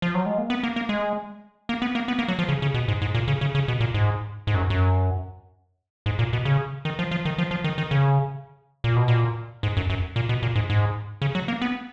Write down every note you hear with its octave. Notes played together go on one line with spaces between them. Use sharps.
F3
F#3
G#3
A#3
B3
A#3
A#3
G#3
A#3
B3
A#3
B3
A#3
F#3
F3
C#3
C#3
B2
G#2
G#2
A#2
C#3
C#3
C#3
B2
A#2
G#2
G#2
F#2
F#2
G#2
A#2
B2
C#3
D#3
F3
F3
D#3
F3
F3
D#3
D#3
C#3
A#2
B2
A#2
G#2
F#2
F#2
A#2
B2
A#2
G#2
G#2
C#3
F#3
A#3
B3